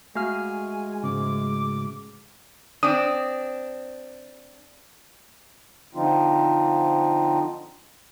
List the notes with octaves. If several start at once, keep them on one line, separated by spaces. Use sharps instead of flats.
G#3 A3 F#4 F5 G#5 F6
G#2 C#3 D6
C4 D4 D#6
D3 F3 C4 D#4 F4